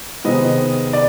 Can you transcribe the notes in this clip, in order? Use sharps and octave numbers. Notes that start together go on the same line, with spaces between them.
C3 D#3 G#3 B3 D#5
D5